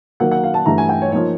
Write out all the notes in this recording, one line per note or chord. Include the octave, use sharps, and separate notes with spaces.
D#3 F#3 A#3 F#5
F#5
F5
A5
G2 E3 A3 A#5
G#5
G5
C#5
F3 A#3 D#4 C#5